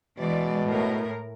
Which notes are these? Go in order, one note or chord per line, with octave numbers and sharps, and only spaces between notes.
B2 E3 G#3 D5
A2 A#4